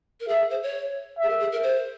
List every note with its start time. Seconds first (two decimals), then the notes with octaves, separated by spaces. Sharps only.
0.20 A#4
0.28 G#4 E5
0.51 C5
0.63 C#5
1.18 G#4 E5
1.29 A#4
1.40 G#4
1.52 A#4
1.63 C5